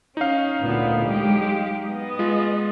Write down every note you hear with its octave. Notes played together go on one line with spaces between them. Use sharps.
C#4 D#4 F5
D2 A#2 B3
F#3 G#3 G4
B3 D#5
G#3 F4